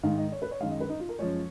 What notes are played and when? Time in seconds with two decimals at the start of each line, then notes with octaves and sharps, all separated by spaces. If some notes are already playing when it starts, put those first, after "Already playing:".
0.03 G#2 D#3 G#3 F5
0.18 D#5
0.32 C#5
0.42 B4
0.51 C#5
0.60 F#2 D#3 G#3 F5
0.71 D#5
0.80 B4
0.89 D#4
1.00 F4
1.09 A#4
1.19 F#2 F3 G#3 C#5